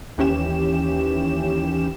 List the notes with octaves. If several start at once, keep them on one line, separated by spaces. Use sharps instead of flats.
D#2 E3 C#4 G4 E7